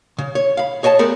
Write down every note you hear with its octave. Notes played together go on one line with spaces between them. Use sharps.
C#3
C#5
F5 B5
G#4 C#5 D#5 G#5 A5
G3 A3 B3 G#4 A#4 C5